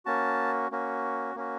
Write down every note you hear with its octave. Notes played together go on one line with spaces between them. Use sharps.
A#3 C#4 F#4 A5
A#3 C#4 F#4
A#3 C#4 F#4